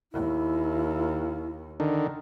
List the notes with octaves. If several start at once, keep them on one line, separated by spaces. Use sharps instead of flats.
D#2 E4
D3 D#3